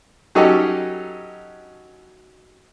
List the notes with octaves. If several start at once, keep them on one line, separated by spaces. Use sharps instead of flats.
F#3 C#4 D#4 G4 A4 D#5